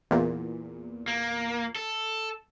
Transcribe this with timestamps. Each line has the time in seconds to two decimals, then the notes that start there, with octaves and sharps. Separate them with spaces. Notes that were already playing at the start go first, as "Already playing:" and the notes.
0.11 E2 A#2
1.08 A#3
1.76 A4